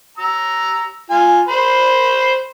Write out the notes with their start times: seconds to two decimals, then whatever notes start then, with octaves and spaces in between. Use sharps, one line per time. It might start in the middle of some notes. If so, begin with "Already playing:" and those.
0.18 A#5 E6
1.10 F4 G#5
1.48 C5 B5 C6